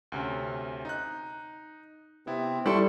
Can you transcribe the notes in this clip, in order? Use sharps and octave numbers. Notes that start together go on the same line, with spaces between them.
D2 C3 C#4
D#4 F#6
C3 B3 C4 E4
G3 E4 A4 D5 C6 C#6